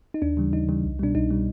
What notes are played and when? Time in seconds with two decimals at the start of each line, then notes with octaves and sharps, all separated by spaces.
0.14 D#4
0.22 D#2 D4
0.37 C#3 E3 G3
0.53 D#2 D#4
0.69 C#3 E3 G3
0.84 C2
0.99 B2 G3 D4
1.15 C2 D#4
1.31 B2 G3